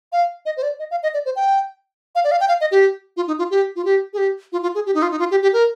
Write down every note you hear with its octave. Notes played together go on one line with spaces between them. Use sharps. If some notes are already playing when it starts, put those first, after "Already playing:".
F5
D#5
C5
D5
D#5
F5
D#5
D5
C5
G5
F5
D5
F5
G5
F5
D#5
G4
F4
D#4
F4
G4
F4
G4
G#4
G4
F4
F4
G#4
G4
D#4
F4
D#4
F4
G4
G4
A#4